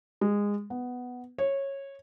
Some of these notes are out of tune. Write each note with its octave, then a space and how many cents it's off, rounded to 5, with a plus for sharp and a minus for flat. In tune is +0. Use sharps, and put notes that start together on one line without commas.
G#3 -20
B3 +5
C#5 -15